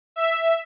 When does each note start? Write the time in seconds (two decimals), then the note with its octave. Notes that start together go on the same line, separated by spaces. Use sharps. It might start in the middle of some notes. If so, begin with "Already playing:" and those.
0.16 E5